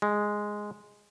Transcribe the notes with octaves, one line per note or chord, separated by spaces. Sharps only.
G#3